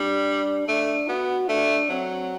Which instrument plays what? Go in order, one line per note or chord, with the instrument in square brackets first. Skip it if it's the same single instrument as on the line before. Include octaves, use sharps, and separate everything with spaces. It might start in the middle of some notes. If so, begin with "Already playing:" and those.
Already playing: [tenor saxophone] G3 [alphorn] D4
[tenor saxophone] A3 [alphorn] D4
[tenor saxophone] B3 [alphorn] F#4
[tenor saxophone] A3 [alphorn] D4
[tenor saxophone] F#3 [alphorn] C4